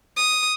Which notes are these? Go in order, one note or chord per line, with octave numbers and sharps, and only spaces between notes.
D#6